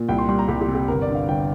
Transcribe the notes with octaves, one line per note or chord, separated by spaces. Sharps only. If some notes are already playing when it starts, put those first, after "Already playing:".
Already playing: A#2
C2 G5
C6
G3 C6
A#5
C2 G4
G4
C3
G4
G1 A#4
D5
D3
F5
G1 G5